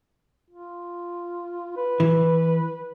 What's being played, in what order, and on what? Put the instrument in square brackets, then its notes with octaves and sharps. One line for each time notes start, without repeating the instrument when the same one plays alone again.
[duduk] F4
B4
[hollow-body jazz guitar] E3